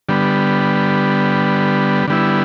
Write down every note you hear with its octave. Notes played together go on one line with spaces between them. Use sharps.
D3 G3 B3
D3 G3 B3 E4